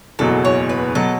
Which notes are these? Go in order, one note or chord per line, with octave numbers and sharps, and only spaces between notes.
F#1 E2 B2 F#3 A4
C#5
B4
B2 F#3 A4